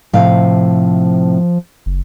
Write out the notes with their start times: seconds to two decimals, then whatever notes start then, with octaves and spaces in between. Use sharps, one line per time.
0.13 A2 C3 F3 F5
1.86 F#1